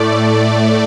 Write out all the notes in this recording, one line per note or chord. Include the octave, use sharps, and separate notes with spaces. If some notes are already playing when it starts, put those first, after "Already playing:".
Already playing: A2 A3 D5
D5